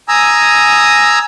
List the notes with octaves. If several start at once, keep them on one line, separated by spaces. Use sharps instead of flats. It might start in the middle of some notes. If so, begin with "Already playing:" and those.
G#5 A#5 D#6 E6